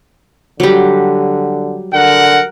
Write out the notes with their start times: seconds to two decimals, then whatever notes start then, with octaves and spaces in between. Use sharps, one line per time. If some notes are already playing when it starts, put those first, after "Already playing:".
0.60 D3 F#3 G3
1.94 D3 A#4 F#5